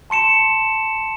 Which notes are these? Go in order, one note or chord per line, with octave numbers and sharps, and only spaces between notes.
A5 C6 C#7 E7